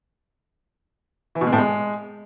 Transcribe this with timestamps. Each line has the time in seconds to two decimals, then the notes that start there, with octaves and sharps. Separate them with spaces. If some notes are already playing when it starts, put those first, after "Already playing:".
1.35 E3
1.41 B2
1.47 G#3
1.53 A2
1.58 G#3